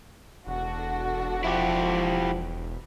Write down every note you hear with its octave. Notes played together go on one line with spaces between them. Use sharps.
E1 D4 F#4 A4
F3 E4 G4